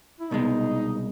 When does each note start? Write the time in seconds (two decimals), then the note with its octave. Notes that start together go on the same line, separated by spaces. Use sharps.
0.20 E4
0.31 C2 B2 G#3 D#4